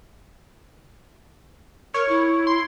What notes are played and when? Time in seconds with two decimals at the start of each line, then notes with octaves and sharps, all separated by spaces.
1.94 A#4 C#5
2.09 E4
2.47 C6